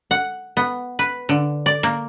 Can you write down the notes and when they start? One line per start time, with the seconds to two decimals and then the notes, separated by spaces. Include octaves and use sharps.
0.11 F#5
0.57 B3
0.99 B4
1.29 D3
1.66 D5
1.83 A#3